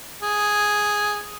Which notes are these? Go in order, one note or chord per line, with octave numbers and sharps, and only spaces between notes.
G#4